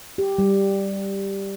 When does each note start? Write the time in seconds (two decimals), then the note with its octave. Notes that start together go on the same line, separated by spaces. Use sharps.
0.18 G4
0.38 G3